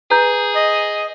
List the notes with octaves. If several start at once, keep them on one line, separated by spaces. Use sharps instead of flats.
G#4 B4 A#5 G6
D#5